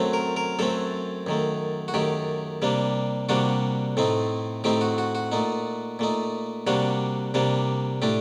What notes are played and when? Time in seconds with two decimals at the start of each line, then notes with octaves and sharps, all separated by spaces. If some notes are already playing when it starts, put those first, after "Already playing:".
Already playing: F#2 F#3 A3 C4
0.13 A#4
0.37 A#4
0.59 F#2 F#3 A3 C4 A4
1.27 F#2 D#3 A3
1.88 F#4
1.94 F#2 D#3 A3 G4
2.62 C3 G3 A#3 D4
3.29 C3 G3 A#3 D4 F#4
3.97 A2 A3 C4 D#4
4.64 A2 A3 C4 D#4 G4
4.81 F#4
4.98 F#4
5.15 F#4
5.32 A#2 A3 D#4
5.99 A#2 A3 D#4
6.67 C3 G3 A#3 D4 F#4
7.34 C3 G3 A#3 D4
8.02 A2 A3 D4 G4